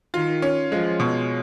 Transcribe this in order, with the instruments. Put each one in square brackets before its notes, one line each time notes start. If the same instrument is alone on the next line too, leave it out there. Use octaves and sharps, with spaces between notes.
[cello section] D#3 [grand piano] F4
[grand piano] C#4
[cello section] F3 [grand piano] G#3
[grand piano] B2